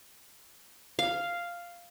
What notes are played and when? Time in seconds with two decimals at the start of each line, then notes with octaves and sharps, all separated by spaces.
0.99 F5